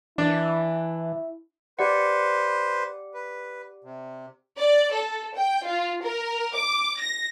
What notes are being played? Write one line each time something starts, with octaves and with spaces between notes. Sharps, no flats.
E3 D4 E4
G4 B4 C5 D5 F#5
B4
C3
D5
A4
G5
F4
A#4
D6
A#6